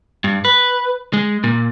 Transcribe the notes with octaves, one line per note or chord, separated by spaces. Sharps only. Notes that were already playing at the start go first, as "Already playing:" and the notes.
G2
B4
G#3
A#2